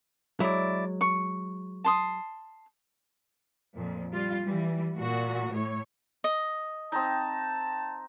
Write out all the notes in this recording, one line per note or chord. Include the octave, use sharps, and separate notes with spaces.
F#3 G#3 E4 D5
C#6
A5 C6 D#6
F2 A#2
G3 F4
E3 G3
A#2 F#4
A2 C#5
D#5
C4 D#4 A5